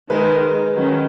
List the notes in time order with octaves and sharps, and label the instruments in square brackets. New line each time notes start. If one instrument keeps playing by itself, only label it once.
[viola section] D#3 G#3 D#4 A#4 [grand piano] G#4 B4
[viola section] D#3 F#3 C#4